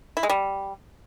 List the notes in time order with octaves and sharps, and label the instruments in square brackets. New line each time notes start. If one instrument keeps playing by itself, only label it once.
[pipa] E4
G#3
G3